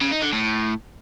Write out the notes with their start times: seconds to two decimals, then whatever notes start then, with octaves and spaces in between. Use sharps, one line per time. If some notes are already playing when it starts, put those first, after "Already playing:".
0.01 C#3
0.12 D#4
0.22 D3
0.33 A2